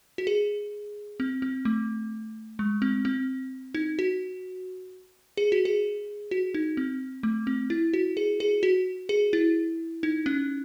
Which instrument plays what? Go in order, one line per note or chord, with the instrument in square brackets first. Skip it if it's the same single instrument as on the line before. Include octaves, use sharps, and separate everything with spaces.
[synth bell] F#4
G#4
C4
C4
A3
G#3
C4
C4
D#4
F#4
G#4
F#4
G#4
F#4
D#4
C4
A3
C4
E4
F#4
G#4
G#4
F#4
G#4
E4
D#4
C#4